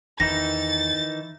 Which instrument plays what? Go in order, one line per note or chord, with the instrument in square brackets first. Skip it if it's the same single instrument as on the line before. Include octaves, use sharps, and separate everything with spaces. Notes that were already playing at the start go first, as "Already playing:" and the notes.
[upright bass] E2 [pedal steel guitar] D#3 E3 D#4 [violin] A6 [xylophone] A#6